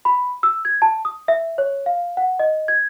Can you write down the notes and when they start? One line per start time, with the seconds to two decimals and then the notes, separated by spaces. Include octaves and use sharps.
0.05 B5
0.43 E6
0.65 G#6
0.82 A5
1.05 D#6
1.28 E5
1.58 C#5
1.86 F5
2.17 F#5
2.39 D#5
2.68 G#6